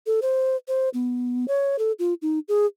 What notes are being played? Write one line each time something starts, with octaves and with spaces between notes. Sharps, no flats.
A4
C5
C5
B3
C#5
A4
F4
D#4
G#4